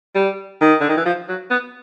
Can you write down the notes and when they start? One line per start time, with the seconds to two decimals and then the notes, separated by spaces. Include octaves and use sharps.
0.15 G3
0.61 D#3
0.81 D3
0.89 D#3
0.97 E3
1.05 F3
1.29 F#3
1.50 B3